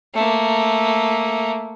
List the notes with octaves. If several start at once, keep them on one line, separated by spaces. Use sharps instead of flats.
A3 A#3